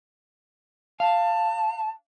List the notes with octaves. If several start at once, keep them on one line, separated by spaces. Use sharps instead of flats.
F5 A5